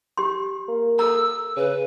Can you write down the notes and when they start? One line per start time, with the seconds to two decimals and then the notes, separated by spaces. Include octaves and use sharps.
0.17 G4 C6
0.68 A#3
0.99 A4 A#5 E6
1.57 C#3 B4